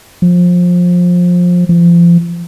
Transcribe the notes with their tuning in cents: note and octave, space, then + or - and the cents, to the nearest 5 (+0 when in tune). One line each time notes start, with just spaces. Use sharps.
F3 +20
F3 -30